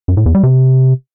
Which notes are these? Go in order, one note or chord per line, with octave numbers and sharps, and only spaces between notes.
F#2
A2
E2
G3
C3